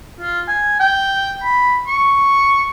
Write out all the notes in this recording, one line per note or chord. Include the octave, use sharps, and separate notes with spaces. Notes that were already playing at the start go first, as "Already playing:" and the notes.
F4
G#5
G5
B5
C#6